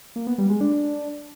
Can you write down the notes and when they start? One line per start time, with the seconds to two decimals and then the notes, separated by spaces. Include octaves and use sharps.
0.16 A#3
0.27 B3
0.38 G3
0.49 G#3
0.61 D4